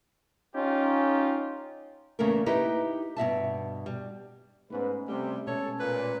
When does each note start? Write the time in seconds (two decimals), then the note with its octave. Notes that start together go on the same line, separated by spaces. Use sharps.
0.55 C#4 D#4 F4 G4
2.19 E2 C#3 A3 A#3 C#4 A#4
2.46 D#4 E4 G4 B4 D#5
3.16 G2 B2 E5 A5
3.86 G3
4.70 G#2 A3 B3 C#4 B4
5.08 C3 G3 A3
5.47 B2 G#3 C#4 A4 C#5
5.79 A#2 B4